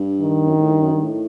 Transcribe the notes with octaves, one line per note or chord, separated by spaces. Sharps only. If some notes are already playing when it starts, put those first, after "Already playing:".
Already playing: G2
D#3
F#2
G2
A2
G2
F#2
G2
A2